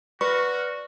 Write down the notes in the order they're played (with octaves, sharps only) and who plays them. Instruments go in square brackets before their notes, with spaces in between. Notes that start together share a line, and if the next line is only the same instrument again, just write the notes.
[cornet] F#4 [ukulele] B4 [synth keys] D5 F6 A#6 [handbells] C#6